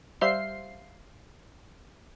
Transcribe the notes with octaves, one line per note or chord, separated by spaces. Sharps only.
G3 C5 E5 F5 C6 C7